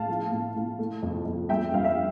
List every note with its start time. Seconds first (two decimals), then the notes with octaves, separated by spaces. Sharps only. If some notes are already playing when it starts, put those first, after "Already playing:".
Already playing: A2 F5 A5
0.08 F3
0.32 A2
0.56 A2
0.79 A3
1.03 F2
1.26 F2
1.49 G2 E5 G5
1.72 G2 F5
1.84 E5